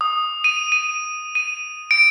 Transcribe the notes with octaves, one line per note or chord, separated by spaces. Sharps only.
D#6
D#7
D#7
D#7
D7